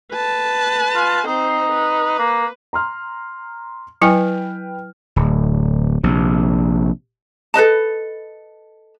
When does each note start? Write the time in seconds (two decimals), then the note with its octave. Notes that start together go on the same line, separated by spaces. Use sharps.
0.11 B4 A5
0.96 F4
1.27 C4 D#4 C5
1.72 B4
2.19 A#3
2.73 A#5 C6 F6
4.02 F#3 E4 B4 G5 G#5 F6
5.16 D1
6.04 A#1 C3
7.54 A4 B4 D#5 A5